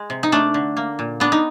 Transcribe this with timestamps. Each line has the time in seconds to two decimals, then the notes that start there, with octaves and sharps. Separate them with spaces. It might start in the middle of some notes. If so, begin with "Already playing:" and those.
Already playing: G#3
0.10 C3
0.23 D#4
0.32 A3 D4
0.54 D3
0.77 A#3
0.99 A#2
1.20 B3 D4
1.32 D#4